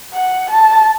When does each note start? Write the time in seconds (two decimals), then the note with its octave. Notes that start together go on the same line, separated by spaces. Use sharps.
0.14 F#5
0.51 A5